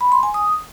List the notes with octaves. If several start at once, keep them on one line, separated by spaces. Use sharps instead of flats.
B5
C6
G#5
D#6